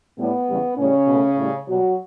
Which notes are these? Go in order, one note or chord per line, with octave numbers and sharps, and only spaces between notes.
A2 G3 B3
E2 C#3 G3
A2 C#3 G3 C#4
B2 A3
A2 G3
B2 F#3 G3 F#4